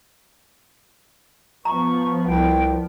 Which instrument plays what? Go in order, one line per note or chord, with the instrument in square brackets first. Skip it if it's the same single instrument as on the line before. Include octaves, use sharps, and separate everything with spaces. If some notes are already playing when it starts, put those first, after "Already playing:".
[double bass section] F3 B3 [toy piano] A#5 [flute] C#6
[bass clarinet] C2 [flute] G5